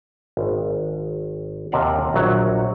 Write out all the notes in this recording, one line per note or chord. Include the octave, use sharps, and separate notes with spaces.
G#1
D#2 C3 A#4 D5 F5 F#5
A#1 F#3 F#5